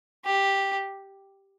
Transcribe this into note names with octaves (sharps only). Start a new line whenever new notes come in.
G4